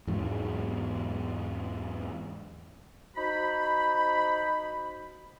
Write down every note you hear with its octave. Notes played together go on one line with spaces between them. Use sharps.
E2 G#2 F#3
D#4 F#4 C5 B5